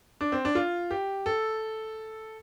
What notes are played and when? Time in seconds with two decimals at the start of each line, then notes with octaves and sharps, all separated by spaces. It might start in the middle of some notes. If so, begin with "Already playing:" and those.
0.21 D4
0.32 C4
0.45 D4
0.55 F4
0.91 G4
1.26 A4